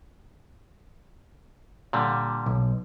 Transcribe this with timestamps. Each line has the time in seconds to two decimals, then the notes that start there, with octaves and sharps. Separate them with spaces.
1.93 A#2 D3 G3
2.46 B1